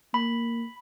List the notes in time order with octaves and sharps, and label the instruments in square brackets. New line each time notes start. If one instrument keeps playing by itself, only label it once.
[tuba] A#3 [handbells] B5